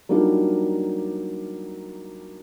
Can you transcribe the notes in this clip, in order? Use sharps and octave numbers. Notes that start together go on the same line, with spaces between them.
F#3 G3 A#3 D4 D#4 F4